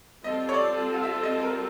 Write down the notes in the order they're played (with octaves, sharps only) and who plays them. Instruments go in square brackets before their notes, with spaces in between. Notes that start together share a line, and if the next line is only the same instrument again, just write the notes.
[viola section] G3 C4 F4 A4 [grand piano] D#5
[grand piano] C#5
D5
F5
E5
D#5
A#4